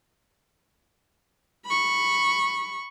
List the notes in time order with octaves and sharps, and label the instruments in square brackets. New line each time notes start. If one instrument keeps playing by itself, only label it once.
[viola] B5 C#6